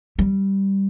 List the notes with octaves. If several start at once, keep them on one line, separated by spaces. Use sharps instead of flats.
G3